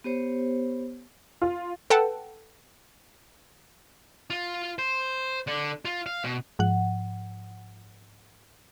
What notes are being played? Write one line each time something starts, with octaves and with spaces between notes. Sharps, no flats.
B3 G4 C5 C#5
F4
A4 B4 F#5 G5 A5
F4
C5
D3
F4
F5
B2
G#2 F3 F#5